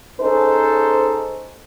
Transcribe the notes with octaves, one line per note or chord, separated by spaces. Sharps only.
C#4 D#4 G#4 A4 C5